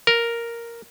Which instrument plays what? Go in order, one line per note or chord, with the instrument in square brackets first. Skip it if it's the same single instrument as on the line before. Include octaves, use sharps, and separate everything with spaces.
[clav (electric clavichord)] A#4